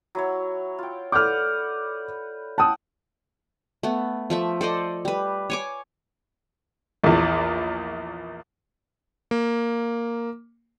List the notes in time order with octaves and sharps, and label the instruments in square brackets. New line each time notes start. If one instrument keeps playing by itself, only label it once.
[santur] F#3 E4 C#5
F4 G5
[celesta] A4 D5 G6 [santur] B4 F#5 [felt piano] D6 F6
[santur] F#5 G5 E6 [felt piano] A5 D#6
[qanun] A3 B3
F3 A3 E5
A4 C5 D5 D#5
G3 B4
C#5 G#5 D6
[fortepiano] A#1 E2
[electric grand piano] A#3